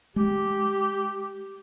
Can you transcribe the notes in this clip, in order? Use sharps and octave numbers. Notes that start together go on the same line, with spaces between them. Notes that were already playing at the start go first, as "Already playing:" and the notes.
G#3 G4